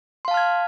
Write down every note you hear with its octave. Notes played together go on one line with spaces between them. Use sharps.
F5 A5 C6 F6 G#6